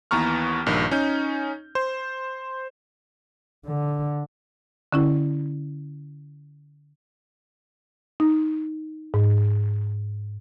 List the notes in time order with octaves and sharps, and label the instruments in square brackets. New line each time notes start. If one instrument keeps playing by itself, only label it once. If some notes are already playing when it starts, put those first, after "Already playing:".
[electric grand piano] D#2 E3 B3 A#5 C#6 F6
A#1 G2 D#3
C#4 D#4 G6
C5
[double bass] D3
[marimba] D3 C#4 E4
D#4
G#2